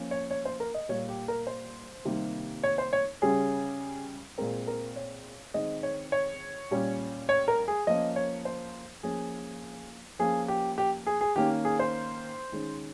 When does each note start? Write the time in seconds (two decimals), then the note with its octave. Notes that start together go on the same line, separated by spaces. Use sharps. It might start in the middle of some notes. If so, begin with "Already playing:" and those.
Already playing: F3 A#3 C#4
0.11 C#5
0.31 C#5
0.45 C5
0.60 A#4
0.74 D#5
0.89 A#2 G3 A#3 C#5
1.09 G4
1.28 A#4
1.47 C5
2.05 C3 D#3 G3 A#3
2.63 C#5
2.78 C5
2.93 C#5
3.22 C#3 G3 C#4 G#4
4.38 A#2 G#3 C4 A#4
4.67 A#4
4.96 C#5
5.54 D#3 G#3 C4 D#5
5.83 C#5
6.12 C#5
6.71 A#2 G3 C#4
7.29 C#5
7.48 A#4
7.68 G#4
7.87 F3 A#3 C#4 D#5
8.16 C#5
8.45 C5
9.03 F3 A#3 C#4 G#4
10.19 F3 A#3 C#4 G#4
10.48 G4
10.78 G4
11.07 G#4
11.21 G#4
11.36 D#3 A#3 C#4 G4
11.65 G#4
11.79 C5
12.52 D#3 G#3 C#4